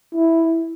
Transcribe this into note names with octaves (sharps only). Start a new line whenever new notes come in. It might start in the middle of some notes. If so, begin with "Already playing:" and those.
E4